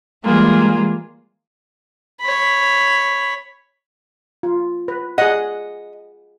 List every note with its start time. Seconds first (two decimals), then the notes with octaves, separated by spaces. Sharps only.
0.23 E3 G3 G#3 A#3 F4 G#4
2.21 C#5 B5
4.43 F4
4.88 B4
5.18 G#4 D#5 F#5